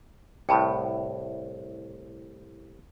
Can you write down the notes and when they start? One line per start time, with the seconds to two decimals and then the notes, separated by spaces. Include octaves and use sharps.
0.49 C2 A2 G5 A5 B5